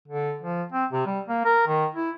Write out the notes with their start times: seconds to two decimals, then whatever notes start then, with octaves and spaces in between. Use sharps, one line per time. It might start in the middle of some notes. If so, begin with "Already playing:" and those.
0.08 D3
0.42 F3
0.72 C4
0.92 C3
1.06 G3
1.29 A#3
1.45 A#4
1.67 D#3
1.95 E4